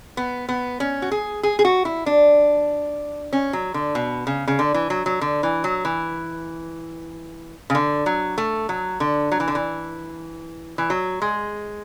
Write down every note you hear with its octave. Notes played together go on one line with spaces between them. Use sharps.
B3
B3
C#4
F#4
G#4
G#4
G#4
F#4
E4
D4
C#4
F#3
D3
B2
C#3
C#3
D3
E3
F#3
F#3
D3
E3
F#3
E3
C#3
D3
F#3
A3
F#3
D3
F#3
E3
D3
E3
E3
F#3
G#3